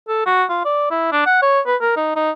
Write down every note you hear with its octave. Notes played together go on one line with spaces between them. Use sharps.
A4
F#4
F4
D5
E4
D4
F#5
C#5
B4
A#4
D#4
D#4